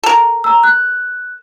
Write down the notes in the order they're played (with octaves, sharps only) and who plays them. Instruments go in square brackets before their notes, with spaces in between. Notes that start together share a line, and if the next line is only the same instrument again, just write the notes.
[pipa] A4 A#4
[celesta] A#5 E6
F#6